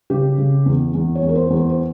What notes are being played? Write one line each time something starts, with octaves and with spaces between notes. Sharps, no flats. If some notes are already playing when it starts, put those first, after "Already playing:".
C#3 G4
C#3
E2
E2
C#5
E2
A#4
C5
E2
C5
C5